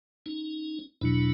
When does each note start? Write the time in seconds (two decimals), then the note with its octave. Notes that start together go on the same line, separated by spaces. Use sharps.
0.26 C#4 D#4
1.01 E2 B2 F#3 D4 E4